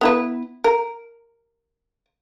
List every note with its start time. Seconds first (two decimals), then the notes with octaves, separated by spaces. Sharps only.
0.01 B3 E4 B4
0.64 A#4